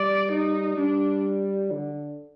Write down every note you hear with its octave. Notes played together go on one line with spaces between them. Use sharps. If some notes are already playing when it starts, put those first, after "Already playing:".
Already playing: G3 D5
D#4
G3 D4
D3